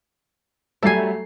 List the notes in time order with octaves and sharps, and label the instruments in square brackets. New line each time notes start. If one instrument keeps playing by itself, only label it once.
[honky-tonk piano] F#3 A3 E5 [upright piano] G3 C7 [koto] A4 G#5